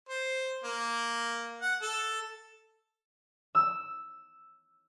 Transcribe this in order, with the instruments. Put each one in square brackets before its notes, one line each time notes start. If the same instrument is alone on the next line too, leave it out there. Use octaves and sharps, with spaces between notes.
[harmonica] C5
A#3
F#5
A4
[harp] E6